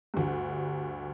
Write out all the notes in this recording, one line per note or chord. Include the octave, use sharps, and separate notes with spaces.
D2 G2